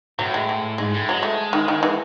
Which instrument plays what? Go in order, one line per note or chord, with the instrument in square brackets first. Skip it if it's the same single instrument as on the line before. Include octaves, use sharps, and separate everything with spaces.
[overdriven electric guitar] A2 [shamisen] F#3
[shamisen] G#3
G#3
[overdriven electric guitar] G#2 [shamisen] G#3
[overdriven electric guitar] A2
[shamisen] F#3 [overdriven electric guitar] G#3
[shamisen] A3
D#3
D#3
E3